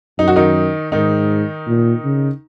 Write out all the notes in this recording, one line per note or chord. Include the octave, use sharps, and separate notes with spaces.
F#2 D#4
F#4
D#3 D#4
G#2 D#3 D#4
A#2
C#3